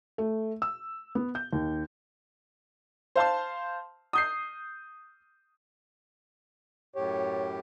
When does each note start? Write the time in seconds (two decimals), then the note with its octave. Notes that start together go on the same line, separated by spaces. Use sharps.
0.18 A3
0.62 E6
1.15 B3
1.35 G6
1.53 D#2
3.16 C5 F5 A5 C6
4.13 D#6 G6 C7
6.96 F#2 A2 G4 C#5